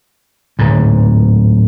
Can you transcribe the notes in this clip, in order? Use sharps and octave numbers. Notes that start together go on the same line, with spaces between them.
D1 G#2